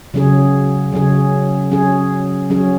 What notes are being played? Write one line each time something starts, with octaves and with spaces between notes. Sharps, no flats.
C#3 F#3 C#4 G#4
C#3 F#3 C#4 G#4
F#3 C#4 G#4
F#3 C#4 G#4